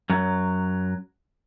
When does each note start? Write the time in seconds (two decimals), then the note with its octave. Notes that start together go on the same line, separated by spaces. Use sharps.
0.10 F#2 F#3